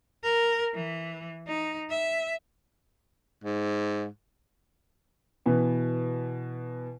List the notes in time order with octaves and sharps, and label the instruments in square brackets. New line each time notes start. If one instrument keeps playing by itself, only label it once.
[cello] A#4
E3
D#4
E5
[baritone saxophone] G#2
[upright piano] B2 E3 B3